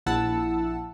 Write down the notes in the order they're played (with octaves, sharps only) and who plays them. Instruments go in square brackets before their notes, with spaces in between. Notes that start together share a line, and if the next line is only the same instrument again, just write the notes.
[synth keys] A#1 E4 F#5 A5 E6